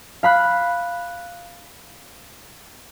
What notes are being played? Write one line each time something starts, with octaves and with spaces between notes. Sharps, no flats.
F5 B5 F#6